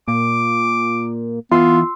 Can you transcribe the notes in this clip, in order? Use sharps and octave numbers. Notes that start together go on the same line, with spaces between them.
A#2 D6
E3 B3 F4 C6 E6